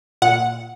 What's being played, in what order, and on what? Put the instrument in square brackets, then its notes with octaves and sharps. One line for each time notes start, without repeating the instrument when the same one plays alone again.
[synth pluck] A#2 F#5